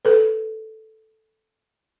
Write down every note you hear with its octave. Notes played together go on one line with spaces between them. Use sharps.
A4 B4